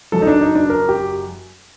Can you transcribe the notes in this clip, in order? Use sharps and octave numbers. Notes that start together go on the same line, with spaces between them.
F#1 F#2 F#3 A4
D#4
D4
D#4
D4
A#4
G4